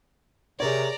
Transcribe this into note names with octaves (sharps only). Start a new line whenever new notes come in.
C3 G#4 A#4 C#5 D5 A#5